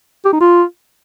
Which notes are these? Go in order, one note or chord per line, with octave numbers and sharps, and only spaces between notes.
G4
D#4
F4